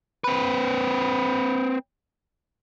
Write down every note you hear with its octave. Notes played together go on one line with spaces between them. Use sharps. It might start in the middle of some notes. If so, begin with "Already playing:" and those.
C4 B4